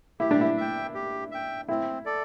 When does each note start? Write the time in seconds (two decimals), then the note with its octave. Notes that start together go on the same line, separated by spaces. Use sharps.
0.20 E4 G4
0.31 D4
0.41 E4
0.57 E5 G5
0.94 G4
1.31 E5 G5
1.69 C4 E4
2.06 A4 D5